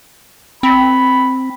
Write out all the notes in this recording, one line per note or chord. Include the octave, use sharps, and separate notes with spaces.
C4 B5